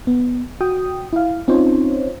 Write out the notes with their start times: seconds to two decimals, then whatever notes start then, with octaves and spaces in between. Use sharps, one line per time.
0.07 B3
0.61 F#4 G5 D#6
1.13 E4 F5
1.48 C4 C#4 D#4 F4 C5 C#5